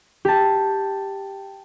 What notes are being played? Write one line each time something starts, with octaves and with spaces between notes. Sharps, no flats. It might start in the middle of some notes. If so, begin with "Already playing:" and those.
G4 A5